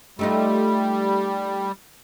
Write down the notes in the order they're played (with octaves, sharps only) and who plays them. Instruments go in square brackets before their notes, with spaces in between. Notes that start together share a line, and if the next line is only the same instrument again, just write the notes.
[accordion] G3 [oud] A3 D#4 F4